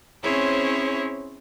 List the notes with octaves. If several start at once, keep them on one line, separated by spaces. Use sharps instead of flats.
C4 C#4 E4 G#4 C5 C#5